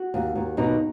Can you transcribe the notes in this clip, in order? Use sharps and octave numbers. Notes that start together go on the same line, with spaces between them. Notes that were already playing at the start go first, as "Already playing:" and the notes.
Already playing: F#4
D#2
D#2
B2 D#4